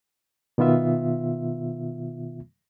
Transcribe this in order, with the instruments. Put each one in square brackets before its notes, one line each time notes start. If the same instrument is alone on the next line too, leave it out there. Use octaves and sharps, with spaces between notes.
[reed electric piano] B2 D#3 B3 F4 E5